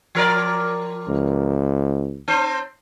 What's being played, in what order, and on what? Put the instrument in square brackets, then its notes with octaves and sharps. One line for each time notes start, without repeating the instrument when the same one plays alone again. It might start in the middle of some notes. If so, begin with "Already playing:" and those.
[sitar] F3 A#4 D5
[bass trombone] C#2
[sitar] C4 C5